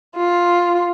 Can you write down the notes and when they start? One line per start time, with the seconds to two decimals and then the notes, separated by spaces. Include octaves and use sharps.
0.17 F4